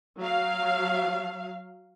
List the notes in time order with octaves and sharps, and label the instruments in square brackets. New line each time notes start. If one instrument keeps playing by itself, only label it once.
[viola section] F#3 F5